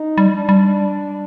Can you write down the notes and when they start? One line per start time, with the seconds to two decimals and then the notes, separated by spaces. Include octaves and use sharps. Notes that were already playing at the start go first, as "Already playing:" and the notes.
Already playing: D#4
0.18 G3
0.33 D4
0.49 G3